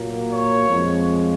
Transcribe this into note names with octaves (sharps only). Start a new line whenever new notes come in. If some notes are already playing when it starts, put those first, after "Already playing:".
Already playing: A#2 F#3 A#3
C#5
F2 F3 G#3